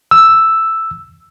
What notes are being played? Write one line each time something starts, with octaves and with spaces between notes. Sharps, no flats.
E6